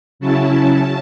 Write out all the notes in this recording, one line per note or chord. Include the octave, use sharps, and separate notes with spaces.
C#3 F#3 C#4 E4 A5